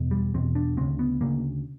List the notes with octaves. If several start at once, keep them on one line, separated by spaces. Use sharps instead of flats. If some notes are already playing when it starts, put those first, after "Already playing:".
Already playing: E2 B2
G3
E2 B2 C4
D4
D2 C#3 C4
B3
D2 C#3 A#3